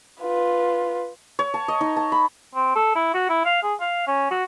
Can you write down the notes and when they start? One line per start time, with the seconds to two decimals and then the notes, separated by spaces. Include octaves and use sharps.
0.22 F4 B4
1.39 C#5
1.54 A5
1.68 D#5
1.81 D#4
1.96 A5
2.12 B5
2.55 C4
2.76 A4
2.96 E4
3.14 F#4
3.29 E4
3.45 F5
3.63 G#4
3.81 F5
4.07 C#4
4.31 F#4